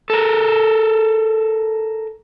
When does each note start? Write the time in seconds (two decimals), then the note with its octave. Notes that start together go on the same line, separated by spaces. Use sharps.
0.10 A4 A#4